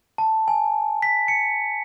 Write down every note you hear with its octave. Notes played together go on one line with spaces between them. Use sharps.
A5
G#5
B6
C#7